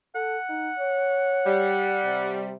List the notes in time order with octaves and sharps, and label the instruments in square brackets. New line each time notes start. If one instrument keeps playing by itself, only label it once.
[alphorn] A4 [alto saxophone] F#5
[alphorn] D#4
C#5
[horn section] G3
[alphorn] C3